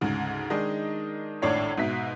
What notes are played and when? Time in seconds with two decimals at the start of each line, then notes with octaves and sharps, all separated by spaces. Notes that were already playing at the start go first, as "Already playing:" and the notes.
0.01 D2 G#2 C#3
0.50 D#3 G#3 D4 D#4
1.42 G#1 A2 D4 C#5 C7
1.77 G#2 B2 E5 B6